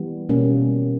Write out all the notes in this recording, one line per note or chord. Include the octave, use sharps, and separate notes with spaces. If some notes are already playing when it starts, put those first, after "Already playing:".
Already playing: E3 G3 B3
B2 G3 A#3 C#4